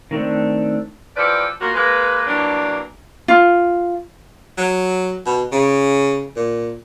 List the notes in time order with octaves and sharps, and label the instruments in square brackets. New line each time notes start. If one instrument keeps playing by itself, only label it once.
[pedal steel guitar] D#3 A3 C4 D4
[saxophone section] E3 F3 G4 A4 B4 D5
A#3 F4 F#4
G#3 A#3 B4
E3 F#3 G3 A#3 D4
[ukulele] F4
[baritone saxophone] F#3
B2
C#3
A#2